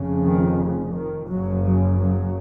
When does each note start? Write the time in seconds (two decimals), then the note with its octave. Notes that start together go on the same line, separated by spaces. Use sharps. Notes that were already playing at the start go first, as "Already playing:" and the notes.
Already playing: F1 F2 C#3
0.24 D#3
0.59 C#3
0.94 D#3
1.28 F#1 F#2 C#3 F#3
1.64 F#3
1.97 F#3